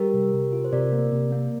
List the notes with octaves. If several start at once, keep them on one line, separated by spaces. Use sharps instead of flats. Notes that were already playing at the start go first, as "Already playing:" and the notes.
Already playing: G3 G4 A#4
C3
C3
F4
C5
C3 A#4 D5
A#3
C3
A#3